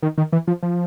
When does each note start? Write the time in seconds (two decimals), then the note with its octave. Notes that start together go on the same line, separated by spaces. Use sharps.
0.02 D#3
0.18 D#3
0.33 E3
0.47 F3
0.63 F3